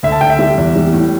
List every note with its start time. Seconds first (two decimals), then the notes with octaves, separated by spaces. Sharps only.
0.03 D2 E5
0.12 A5
0.21 D2 G5
0.30 E5
0.39 G3
0.58 E2
0.76 G3
0.93 A2